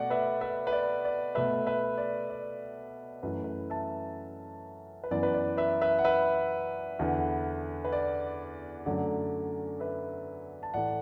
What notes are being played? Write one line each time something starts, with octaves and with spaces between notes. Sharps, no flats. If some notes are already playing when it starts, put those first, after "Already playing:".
Already playing: B2 A3 D5 F#5
B4 E5
B4 E5
B4
D5
D5
B2 A3 B4 E5
B4 E5
D5
D5
F#2 E3 A3 B4
B4
E5 A5
B4
F#2 E3 B3 D5
B4
D5
B4 E5
B4 E5
F#5
B4 E5
E2 D3 B3
B4
D5
F#2 D3 F#3 A3 D5
B4 E5
A5
A2 E3 A3 D5 F#5